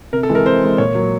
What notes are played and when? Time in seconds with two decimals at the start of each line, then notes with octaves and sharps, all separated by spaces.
0.13 C3 A#4
0.23 A4
0.29 E3 G#3
0.35 A#4
0.45 C3 C5
0.62 E3 G#3
0.78 A#2 C#5
0.95 F#3 A#3